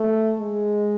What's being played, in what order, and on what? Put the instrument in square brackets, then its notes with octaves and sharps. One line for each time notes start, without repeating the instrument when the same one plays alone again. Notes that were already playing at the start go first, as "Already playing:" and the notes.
Already playing: [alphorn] A3
G#3